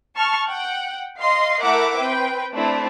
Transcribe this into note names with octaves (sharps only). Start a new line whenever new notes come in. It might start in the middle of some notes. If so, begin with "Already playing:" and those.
A5 C#6 F6
F#5 G5
D#5 F5 C6 C7
A3 E4 A#4 E5 F#5 D6
C4 B4 G5
A3 C4 D4 E4 D5